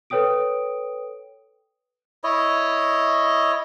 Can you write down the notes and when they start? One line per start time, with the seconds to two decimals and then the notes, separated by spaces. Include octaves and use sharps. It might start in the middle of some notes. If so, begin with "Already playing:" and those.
0.10 A4 B4 C#5 G5 D#6 D7
2.24 E4 C#5 D#5